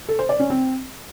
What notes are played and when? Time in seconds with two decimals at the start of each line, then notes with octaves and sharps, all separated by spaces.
0.09 A4
0.19 C5
0.29 D5
0.40 C#4
0.50 C4